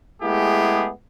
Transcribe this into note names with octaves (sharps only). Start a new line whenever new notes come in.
G#3 A3 B3 E4 G4 G#4